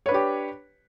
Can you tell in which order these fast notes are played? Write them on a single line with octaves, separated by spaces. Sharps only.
C#5 B4 D4 G4